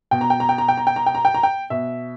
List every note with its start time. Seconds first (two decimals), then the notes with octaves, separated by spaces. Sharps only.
0.11 B2 G5
0.21 A#5
0.30 G5
0.40 A#5
0.49 G5
0.58 A#5
0.68 G5
0.77 A#5
0.87 G5
0.96 A#5
1.06 G5
1.15 A#5
1.25 G5
1.34 A#5
1.43 G5
1.70 B2 E5